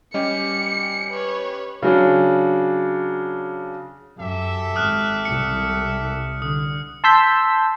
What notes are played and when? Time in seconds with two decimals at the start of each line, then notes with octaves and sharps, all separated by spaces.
0.14 G3 C#4 G4 D#5 C#7
1.11 B4 C#5
1.82 C#3 F#3 C#4 D4
4.18 F#2 G4 A4 E5
4.76 G#1 D#6 F6 F#6
5.25 C2 C#7
6.42 D3 D#6
7.04 A5 C6 E6 G6 B6